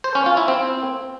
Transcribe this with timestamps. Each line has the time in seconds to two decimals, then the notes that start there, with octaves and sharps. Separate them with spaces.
0.04 C5
0.15 C#4
0.26 F4
0.37 E4
0.48 C4